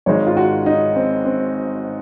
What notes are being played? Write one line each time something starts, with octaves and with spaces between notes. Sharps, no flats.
G#1 G#2 D#3 G#3 C#5
F4
F#4
D#4
C4
C4